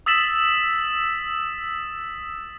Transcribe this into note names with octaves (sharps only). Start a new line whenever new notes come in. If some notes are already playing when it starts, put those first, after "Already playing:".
D#6 E6 A6 B6 E7 F#7